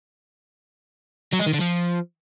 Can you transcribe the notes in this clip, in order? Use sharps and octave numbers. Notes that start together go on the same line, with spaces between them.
F#3
G#3
D#3
D3
F3